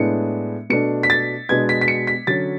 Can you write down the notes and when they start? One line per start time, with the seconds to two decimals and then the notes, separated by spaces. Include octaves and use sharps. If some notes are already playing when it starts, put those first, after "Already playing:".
Already playing: A2 G#3 B3 D4 C#7
0.70 B2 A3 D4 C#7
1.03 B6
1.10 A6
1.49 B2 G#3 B3 D4 G#6
1.69 B6
1.81 B6
1.88 C#7
2.07 B6
2.27 D3 F#3 C#4 A6